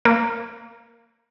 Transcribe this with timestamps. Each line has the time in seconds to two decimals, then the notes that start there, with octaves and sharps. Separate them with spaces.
0.05 A#3